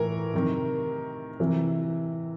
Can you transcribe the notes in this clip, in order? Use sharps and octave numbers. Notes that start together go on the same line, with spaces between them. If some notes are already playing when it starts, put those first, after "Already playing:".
Already playing: A2 E3 A#4
C3 D#3
C3 E3